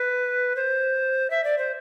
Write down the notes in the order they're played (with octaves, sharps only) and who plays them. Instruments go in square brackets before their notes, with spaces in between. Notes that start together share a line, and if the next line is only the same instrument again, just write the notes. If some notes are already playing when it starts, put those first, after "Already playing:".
Already playing: [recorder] B4
C5
E5
D5
C5